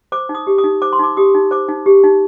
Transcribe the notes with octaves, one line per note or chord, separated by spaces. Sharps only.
C5 D6
D#4
D#6
G4
D#6
D#4
C5 D6
C6
D#4 D6
G4 D#6
D#4
C5 D6
D#4
G4
D#4